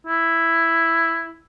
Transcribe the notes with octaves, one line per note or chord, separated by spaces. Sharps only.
E4